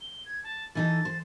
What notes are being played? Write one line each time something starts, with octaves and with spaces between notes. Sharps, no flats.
G7
G#6
A5
E3 D#4 A4 A6
C5